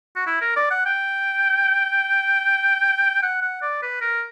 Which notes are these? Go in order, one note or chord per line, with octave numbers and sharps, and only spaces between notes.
F#4
E4
A#4
D5
F#5
G5
F#5
F#5
D5
B4
A#4